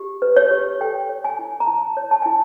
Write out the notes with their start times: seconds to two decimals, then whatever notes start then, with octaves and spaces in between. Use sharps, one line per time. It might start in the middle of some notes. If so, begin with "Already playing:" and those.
Already playing: G4
0.22 B4
0.36 C#5
0.51 G4
0.80 A4 G5
1.09 C#5
1.24 G#5
1.39 E4
1.60 A#5
1.67 E4 A5
1.97 C#5
2.11 A5
2.22 E4 G#5